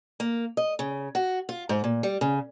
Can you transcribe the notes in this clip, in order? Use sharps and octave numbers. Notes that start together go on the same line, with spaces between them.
A#3
D#5
C#3
F#4
F4
G#2
A#2
G3
C#3